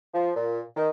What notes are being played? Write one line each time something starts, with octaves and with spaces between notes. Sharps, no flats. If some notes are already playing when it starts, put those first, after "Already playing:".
F3
A#2
D#3